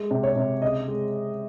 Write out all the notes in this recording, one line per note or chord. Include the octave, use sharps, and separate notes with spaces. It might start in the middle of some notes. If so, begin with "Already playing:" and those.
Already playing: G#3
C3
C#5
C3
C#3 D#5
G#3